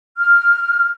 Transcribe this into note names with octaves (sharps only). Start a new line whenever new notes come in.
F6